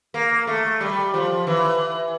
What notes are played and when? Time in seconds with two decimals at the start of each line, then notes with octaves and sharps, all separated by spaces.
0.14 A#3
0.47 A3
0.81 G3
1.14 F3
1.47 E3